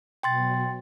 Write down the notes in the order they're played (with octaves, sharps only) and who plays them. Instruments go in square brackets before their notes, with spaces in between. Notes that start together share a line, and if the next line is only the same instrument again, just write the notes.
[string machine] B2 F#3 [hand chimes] G5 C6 A6